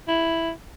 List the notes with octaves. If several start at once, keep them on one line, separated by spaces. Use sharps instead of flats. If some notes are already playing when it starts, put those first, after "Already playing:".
E4